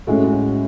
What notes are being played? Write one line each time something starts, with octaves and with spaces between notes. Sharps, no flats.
A2 G#3 C#4 F#4